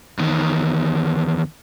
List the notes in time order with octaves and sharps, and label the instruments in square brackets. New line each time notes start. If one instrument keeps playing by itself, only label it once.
[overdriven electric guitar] E2 D#3